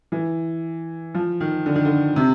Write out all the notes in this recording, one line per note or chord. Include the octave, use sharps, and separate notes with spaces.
E3
F3
D#3
D3
D#3
D3
C3